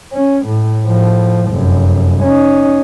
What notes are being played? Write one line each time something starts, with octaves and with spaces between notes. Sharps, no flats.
C#4
A2
A2 F3
F1 F#2
C#4 D#4